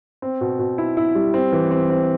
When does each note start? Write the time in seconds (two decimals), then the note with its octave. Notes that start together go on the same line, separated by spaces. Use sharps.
0.22 C4
0.41 B2
0.59 B2
0.78 E4
0.97 E4
1.15 G3
1.34 C4
1.52 E3
1.71 C4
1.90 C4